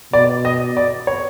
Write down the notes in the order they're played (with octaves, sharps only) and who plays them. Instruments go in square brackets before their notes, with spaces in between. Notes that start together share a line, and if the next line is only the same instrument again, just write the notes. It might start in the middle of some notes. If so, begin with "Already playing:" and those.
[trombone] B2 [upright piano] D5
[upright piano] D#5
D5
C#5